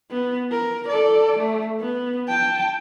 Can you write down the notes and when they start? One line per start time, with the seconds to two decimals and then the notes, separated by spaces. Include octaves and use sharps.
0.11 B3
0.52 A#4
0.89 A4 D5
1.39 A3
1.80 B3
2.28 G5 A5